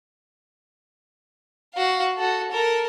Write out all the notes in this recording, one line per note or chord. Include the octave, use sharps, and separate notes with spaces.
F#4 F5
F#4 A4
A4 A#4